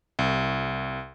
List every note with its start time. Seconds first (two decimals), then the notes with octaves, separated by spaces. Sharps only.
0.19 C2